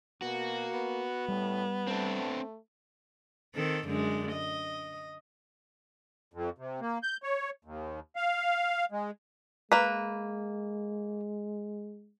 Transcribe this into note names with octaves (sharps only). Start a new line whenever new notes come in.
B2 A#3 F#4
B3
A2 G3
A3 C4 D4
D#3 C4 A4
F#2 D3 G#3
D#5
F2
C3
A#3
G6
C#5
D#2
F5
G#3
G#3 A#3 B4